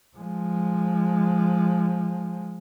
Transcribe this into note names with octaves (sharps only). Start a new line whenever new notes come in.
F3 G#3